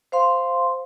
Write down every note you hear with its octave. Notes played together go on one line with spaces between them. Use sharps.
C5 F5 C6